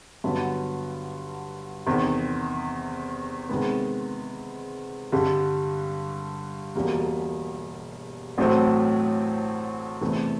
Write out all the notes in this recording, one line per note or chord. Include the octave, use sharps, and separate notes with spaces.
G2 D3 F#3 B3
E2 C3 D#3
C3 D#3 G#3 B3
G2 D3 G3
E1 E2 B2 G3 A#3
A1 A2 F#3 A3 C4
E2 C3 E3 A3